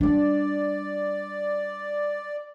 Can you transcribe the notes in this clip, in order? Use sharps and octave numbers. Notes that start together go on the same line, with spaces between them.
G3 D4 D5